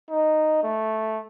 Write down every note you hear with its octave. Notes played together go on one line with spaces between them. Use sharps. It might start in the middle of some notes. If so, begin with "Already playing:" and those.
D#4
A3